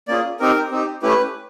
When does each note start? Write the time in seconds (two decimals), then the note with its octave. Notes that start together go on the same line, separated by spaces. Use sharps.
0.08 A#3 C#4 F4 G#4 D5
0.40 C4 D#4 G4 A#4
0.71 C4 D#4 G4
1.02 A3 C#4 E4 G4 B4